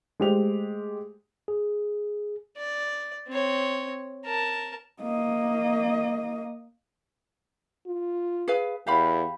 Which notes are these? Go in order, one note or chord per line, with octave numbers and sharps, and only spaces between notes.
G#3 A3 G4 C5 F7
G#4
D5
C4 C#5
A#4 A5
A#3 D#5
F4
G#4 B4 F5
E2 G4 F5 B5